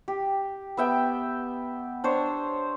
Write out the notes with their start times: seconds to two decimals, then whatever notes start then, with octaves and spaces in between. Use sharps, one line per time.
0.08 G4
0.77 B3 E5 G5
2.04 D4 C5 C#5